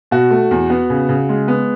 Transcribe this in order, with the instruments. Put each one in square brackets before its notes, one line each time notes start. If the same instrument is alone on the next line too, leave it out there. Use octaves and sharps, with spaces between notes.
[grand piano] B2 F#4
A3
E2
B3
C#3
C#3
G#3
B3